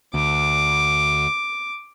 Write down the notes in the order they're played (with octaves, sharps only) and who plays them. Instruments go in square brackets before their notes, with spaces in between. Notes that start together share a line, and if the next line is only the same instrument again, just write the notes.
[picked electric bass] D2 [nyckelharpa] D6